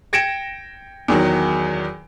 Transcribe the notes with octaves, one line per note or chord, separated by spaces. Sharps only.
G5 G#6 A#6 C#7 D7 E7
E2 D#3 F#3